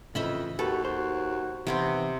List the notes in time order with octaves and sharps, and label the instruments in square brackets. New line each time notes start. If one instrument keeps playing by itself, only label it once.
[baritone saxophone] F2 [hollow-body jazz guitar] A2 C#3 E3 [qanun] D#5 E5 B5
[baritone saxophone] D#2 [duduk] F#4 [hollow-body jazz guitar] G4 B4 [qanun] A4
[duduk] F#4 [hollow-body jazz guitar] C5
[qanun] C3 B3 C4 [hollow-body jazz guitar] D#3 [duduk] E3